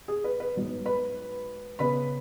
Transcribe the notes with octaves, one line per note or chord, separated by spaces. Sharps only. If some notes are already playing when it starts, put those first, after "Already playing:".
G#4
B4
B4
G#2 F#3 B3
B4 B5
C#3 B3 B4 B5